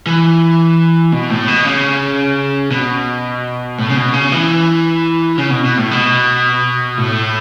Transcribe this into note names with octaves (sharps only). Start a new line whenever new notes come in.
E3
B2
A2
B2
C#3
B2
A2
C#3
B2
C#3
E3
C#3
B2
B2
A2
B2
A2